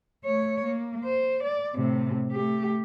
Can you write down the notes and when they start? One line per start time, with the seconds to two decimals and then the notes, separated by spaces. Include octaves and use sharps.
0.25 A3 C#5
0.64 A#3
1.04 C5
1.43 D5
1.75 A2 C3
2.32 A3 G4